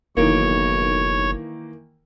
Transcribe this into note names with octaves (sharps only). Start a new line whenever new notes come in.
F#1 B1 D#3 E3 A#3 C#5